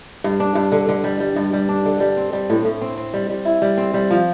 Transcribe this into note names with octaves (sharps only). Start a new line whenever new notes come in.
G2
D4
G2
D3
D3
G3
G3
G2
G3
D4
D3
G3
C4
G3
A2
A2
C4
C4
G3
G3
E4
G3
C4
G3
F3